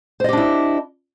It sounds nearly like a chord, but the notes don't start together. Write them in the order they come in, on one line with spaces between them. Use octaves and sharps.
C5 D#5 G4 D4 E4